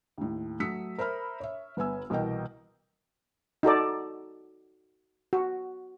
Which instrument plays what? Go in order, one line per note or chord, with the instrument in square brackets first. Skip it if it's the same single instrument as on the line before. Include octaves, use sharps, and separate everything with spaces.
[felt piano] D#2 A2
F#3 A3 D#6 E6 B6 C#7
A#4 C5 E5 B5 F6
C#5 E5
G1 B3 E5 G#5 E6
C2 B2 E3 A#4 D#5 G5
[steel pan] D#4 F#4 A4 D5
F#4